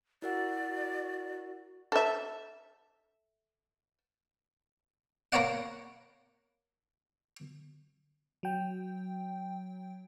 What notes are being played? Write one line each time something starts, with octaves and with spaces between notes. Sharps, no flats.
E4 F#4 A#4 D5 F#5
A4 E5
A#3 A#4 B4 C#5 D5 F#5
F#3 G5